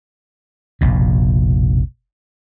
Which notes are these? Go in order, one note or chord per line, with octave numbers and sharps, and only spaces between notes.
F1 A#1 B2